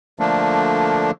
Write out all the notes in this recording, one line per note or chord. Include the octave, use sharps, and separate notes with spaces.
D3 F3 A3 A#3 D4